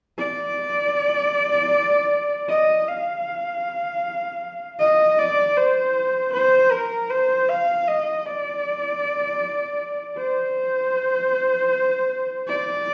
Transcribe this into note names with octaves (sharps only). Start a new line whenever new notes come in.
D5
D#5
F5
D#5
D5
C5
C5
A#4
C5
F5
D#5
D5
C5
D5